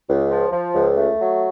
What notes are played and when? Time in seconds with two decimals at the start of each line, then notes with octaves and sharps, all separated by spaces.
0.09 C#2
0.31 F3
0.52 F3
0.73 C#2
0.96 A3
1.18 F#3